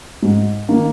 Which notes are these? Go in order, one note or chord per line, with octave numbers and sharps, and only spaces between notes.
G#2
D#3 A#3